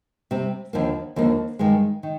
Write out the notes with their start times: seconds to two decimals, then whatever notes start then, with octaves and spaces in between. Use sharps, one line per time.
0.31 C3 G3 C4
0.73 D#2 D3 F3 A#3
1.16 D#2 D3 F3 A#3
1.59 G2 D#3 G#3
2.03 D#3